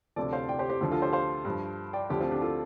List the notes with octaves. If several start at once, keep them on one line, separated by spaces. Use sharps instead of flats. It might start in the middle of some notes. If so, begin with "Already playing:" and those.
D2 C3 F3 A4 D5
C5 F5
D5 G5
G4 C5
G4 C5
D2 D3 F3
F4 A4
G4 C5
C5 F5
G2 F3
D5 G5
D2 D3 F3 D4 G4
C4 F4
D4 G4
F4 A4